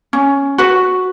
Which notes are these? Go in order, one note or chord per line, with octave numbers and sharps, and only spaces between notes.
C#4
F#4 B4